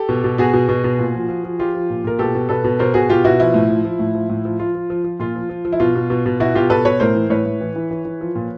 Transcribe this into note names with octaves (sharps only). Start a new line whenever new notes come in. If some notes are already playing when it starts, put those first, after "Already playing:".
Already playing: G4 A4
B2
B2
B2 F#4 G#4
B2
B2
B2
A#2
F3
F3
F3
F3 F4 G4
F3
A#2
A#2 A#4
B2 G4 A4
B2
B2 A4 B4
B2
B2 A#4 C5
B2 F#4 G#4
B2 F4 G4
B2 E4 F#4
F3 E4
A2
F3
F3
A2
F3
A2
F3
F3 F4
F3
F3
F3
A#2 F4
F3
F3
F3
E4
B2 F4
B2
B2
B2
B2 E4 F#4
B2 F4 G4
B2 A4 B4
B2 B4 C#5
A2 A#4 C5
E3
A2 B4 C#5
A2
E3
E3
E3
E3
F3
A#2